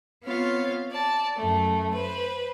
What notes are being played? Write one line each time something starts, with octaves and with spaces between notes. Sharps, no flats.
B3 C4 F4 C#5 F5
D5 A5
F#2 A3
B4 C5